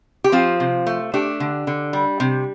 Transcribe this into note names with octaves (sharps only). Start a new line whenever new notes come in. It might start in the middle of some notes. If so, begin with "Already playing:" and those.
G4
F3 C4 F4
C3
A3
A3 D4 G4
D3
D3
G3
C3